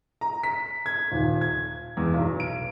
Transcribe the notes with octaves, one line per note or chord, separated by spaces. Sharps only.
A#5
B6
G#6
D#1
G#6
E2
B1
D7